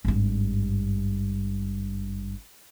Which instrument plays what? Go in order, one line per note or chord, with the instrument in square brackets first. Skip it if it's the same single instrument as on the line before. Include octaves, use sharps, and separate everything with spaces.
[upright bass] G#1 G2